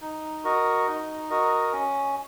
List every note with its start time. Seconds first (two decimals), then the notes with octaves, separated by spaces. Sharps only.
0.01 D#4
0.44 F#4 A#4 D#5
0.87 D#4
1.30 F#4 A#4 D#5
1.73 C#4